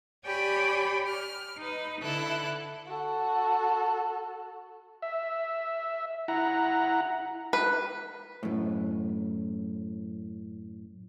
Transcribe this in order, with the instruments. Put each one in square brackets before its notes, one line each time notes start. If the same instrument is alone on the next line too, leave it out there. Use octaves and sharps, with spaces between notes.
[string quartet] G4 C#5 D5 G5 G#5 B5
F6
D#4 B4
D3 E4 A4 F#6
[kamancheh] F#4 A4
[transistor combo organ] E5
E4 F#5 A#5
[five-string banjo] B4
[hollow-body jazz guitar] F#2 A2